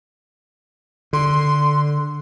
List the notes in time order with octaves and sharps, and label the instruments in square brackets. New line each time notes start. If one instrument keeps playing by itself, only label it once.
[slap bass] D3 [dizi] C6